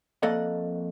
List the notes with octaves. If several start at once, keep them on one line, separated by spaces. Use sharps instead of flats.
F2 A#3 A4 D5 D#5 F#5